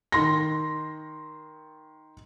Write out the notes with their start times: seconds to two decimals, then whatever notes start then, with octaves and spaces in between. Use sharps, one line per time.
0.12 D#3 C6 A#6